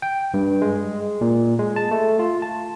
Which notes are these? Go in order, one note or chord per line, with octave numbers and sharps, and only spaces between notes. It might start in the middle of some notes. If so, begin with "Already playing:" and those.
G5
G2
G#3
A#2
G#3
A5
A3
F4
A5